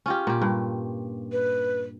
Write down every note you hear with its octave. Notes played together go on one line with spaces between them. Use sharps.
C#4 F4 G4
A#2 G4
G2
B4